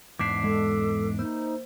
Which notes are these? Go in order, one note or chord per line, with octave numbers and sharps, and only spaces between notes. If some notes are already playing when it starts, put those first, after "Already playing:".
E2 G#2 D4 D6 B6 C7
G#3 A4
A#3 D#4 C5